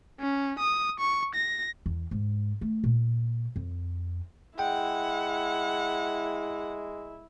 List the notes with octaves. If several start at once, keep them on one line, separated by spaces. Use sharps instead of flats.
C#4
D#6
C#6
A#6
E2
G#2
A3
A#2
F2
G#3 E4 F#5 G5